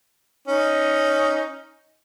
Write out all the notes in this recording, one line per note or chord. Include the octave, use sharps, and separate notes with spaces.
C#4 D#4